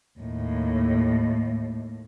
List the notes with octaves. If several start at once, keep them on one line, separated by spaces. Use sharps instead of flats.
D#2 A2